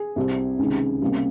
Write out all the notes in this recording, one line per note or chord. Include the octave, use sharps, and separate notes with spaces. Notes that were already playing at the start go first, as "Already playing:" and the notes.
Already playing: G#4
C2 C3 G3
C#2 C3 D#3 G#3
C#2 C3 G3 A#3